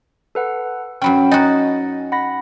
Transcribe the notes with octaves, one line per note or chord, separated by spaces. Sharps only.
A4 B4 F#5
F#2 F#3 C#4 G5 B5
D#4 F#4 D#5 G#5 A6
F#5 B5 A#6